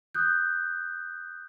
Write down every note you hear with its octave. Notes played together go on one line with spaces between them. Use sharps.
D#6 F#6 G6